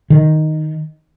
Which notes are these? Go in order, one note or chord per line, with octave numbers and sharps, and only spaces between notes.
D#3